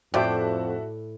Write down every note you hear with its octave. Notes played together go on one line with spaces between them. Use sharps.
F2 A2 F#4 C5 D5 E5 G5 A5